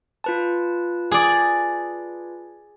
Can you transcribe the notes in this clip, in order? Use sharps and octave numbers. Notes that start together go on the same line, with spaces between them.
F4 B4 A5
G#4 D5